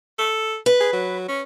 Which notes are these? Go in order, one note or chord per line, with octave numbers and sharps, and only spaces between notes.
A4
B4
G#4
F#3
C#4